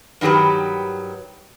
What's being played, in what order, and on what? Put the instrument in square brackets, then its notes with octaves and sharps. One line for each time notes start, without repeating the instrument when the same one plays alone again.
[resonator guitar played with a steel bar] G2 D#3 F#3 G4 B4